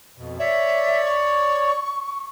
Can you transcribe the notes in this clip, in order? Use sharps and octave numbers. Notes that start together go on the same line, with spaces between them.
F2 B2
C#5 D5 E5
C#6